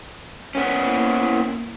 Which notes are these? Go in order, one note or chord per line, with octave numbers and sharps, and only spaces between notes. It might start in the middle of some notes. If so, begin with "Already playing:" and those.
A#3 B3 C#4 E4